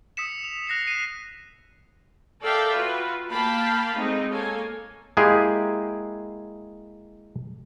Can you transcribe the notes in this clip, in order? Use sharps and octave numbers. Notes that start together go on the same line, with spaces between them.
D#6 E6 B6 C#7 E7
F7
F#6 A#6 C7 E7
C7 D#7
A4 A#4 D5 E5 F5 G5
F4 F#4 B4
A#3 F5 G5 A5 B5
G#3 A3 C4 D#4
A#3 A4 C#5 G#5
G#3 A#3 E4 G4 G#4